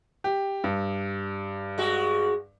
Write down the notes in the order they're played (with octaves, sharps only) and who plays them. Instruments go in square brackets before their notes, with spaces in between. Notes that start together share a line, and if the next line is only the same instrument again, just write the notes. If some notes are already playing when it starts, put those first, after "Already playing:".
[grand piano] G4
G2
[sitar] G#3 F#4